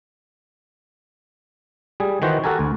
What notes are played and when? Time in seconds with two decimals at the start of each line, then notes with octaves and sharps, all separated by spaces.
2.00 G3 G#4
2.22 D#3 E3 F#4 C5
2.44 F#4 G4 A4 A#4 G#5
2.59 D2